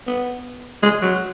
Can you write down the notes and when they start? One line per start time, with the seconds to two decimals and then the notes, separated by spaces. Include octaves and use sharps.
0.07 B3
0.83 G#3
1.02 F#3